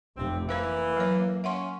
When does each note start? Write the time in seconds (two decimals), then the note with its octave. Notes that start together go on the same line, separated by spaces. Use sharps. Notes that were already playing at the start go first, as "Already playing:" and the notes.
0.17 F1 C3 C4
0.49 E3 A#3 B4 C5 F5
0.97 F#3 C#5
1.44 C#4 E5 F#5 C6